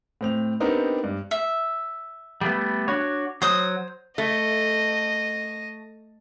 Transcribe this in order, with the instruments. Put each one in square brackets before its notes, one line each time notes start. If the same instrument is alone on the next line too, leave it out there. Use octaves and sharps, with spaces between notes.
[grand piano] A2 C4 F7
B3 C4 D4 D#4 G4 A#4
G2
[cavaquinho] E5
[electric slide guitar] G3 A3 B3
D4 F#4 C#5
[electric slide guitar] F#3 [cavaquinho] C5 D#6
[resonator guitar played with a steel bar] A3 [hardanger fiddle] D#5